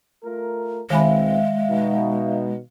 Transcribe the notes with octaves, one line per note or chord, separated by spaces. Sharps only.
A3 F4 A#4
B1 D#3 G#3 C4 E5 F5 G#5 B5
B2 D#4